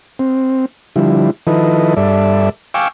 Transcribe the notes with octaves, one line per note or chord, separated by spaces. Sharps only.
C4
D3 F3 G3 E4
D#3 F3 E4 A4 B4 D#5
G2 A4 D5 E5
F5 G5 G#5 C#6 D6 E6